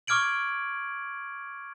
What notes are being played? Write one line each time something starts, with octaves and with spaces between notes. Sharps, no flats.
C#6 D6 F6 G#6 D7 F#7